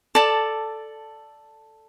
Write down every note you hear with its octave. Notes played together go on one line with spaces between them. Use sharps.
A4 D5 A5